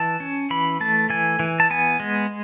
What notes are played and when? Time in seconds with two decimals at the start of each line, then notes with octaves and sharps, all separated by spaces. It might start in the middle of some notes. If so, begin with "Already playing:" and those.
Already playing: E3 A5
0.20 C#4
0.50 E3 B5
0.80 A3 A5
1.10 E3 G#5
1.39 E3
1.60 A5
1.70 B3 G#5
2.00 G#3